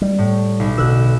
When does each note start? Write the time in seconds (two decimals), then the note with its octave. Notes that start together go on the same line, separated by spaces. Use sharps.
0.01 G3
0.19 A2
0.60 B1
0.78 B2 D3 E6 F#6